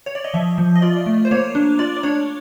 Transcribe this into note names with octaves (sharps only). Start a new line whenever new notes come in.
C#5
D5
D#5
F3 E5
F3
D#5
F4 D5
A3
C5
A#3 C#5
D4
F4 D5
D5
D4 C#5